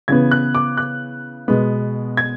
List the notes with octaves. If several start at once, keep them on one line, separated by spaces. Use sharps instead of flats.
C#3 E3 B3 G#6
F#6
D6
F#6
B2 G#3 B3
G#6